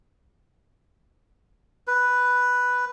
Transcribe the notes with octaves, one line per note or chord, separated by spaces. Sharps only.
B4